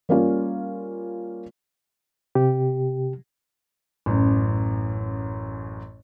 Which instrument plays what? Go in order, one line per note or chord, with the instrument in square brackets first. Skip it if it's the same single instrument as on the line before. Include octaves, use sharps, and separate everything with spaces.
[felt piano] G3 A#3 C#4 F4
[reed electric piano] C3 G4
[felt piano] A1 F#2